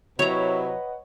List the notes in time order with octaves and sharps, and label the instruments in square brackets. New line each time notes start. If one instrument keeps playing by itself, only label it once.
[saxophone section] C3 F#3 E4 [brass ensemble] B4 D#5 F#5 [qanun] C#5 A#5